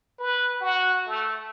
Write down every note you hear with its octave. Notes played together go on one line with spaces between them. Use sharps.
B4
F#4
A3